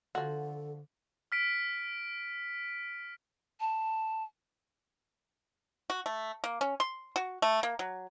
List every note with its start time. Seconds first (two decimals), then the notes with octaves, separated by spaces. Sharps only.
0.15 D3 F3 F#4 A4
1.32 F6 B6 D7
3.60 A5
5.90 F#4
6.06 A3
6.44 A#3
6.61 C#4
6.80 C6
7.16 F#4
7.42 A3
7.63 A#3
7.79 F#3